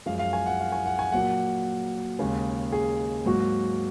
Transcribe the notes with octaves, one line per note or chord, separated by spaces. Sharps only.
F#2 F3 G#3 F5
F5
G#5
F#5
F5
G#5
F#5
G#5
A#2 F#3 A#3 F#5
D#2 C#3 G#3
G#4
G#2 F#3 A#3 F#4